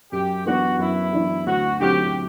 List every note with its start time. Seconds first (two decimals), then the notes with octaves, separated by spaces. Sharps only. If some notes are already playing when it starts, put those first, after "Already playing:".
0.11 F#2 G4
0.45 E3 B3 D4 F#4
0.78 F#2 E4
1.13 E3 B3 D4
1.46 D2 F#4
1.79 D3 F#3 C4 E4 G4